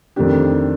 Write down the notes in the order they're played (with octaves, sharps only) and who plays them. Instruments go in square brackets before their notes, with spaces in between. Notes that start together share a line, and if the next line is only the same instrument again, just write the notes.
[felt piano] F2 D#3 A3 D4 G4